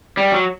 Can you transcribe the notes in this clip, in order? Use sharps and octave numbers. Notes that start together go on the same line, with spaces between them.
G3
F#3